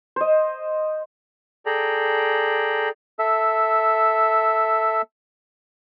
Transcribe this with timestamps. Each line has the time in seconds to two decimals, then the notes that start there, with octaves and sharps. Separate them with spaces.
0.16 C5 D#5
1.66 G#4 A4 D5 G5 A#5
3.19 A4 E5